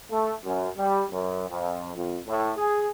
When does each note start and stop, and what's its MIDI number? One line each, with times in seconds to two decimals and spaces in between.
0.11 0.32 57
0.44 0.69 42
0.77 1.01 55
1.10 1.47 42
1.48 1.95 41
1.95 2.17 41
2.26 2.51 45
2.56 2.87 68